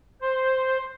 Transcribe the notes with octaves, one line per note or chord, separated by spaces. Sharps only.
C5